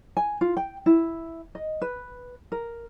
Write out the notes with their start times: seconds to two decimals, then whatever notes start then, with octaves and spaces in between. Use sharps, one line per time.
0.17 G#5
0.41 F4
0.57 G5
0.86 E4
1.55 D#5
1.82 B4
2.52 A#4